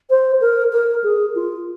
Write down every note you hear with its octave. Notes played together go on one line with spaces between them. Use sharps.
C5
A#4
A#4
G#4
F4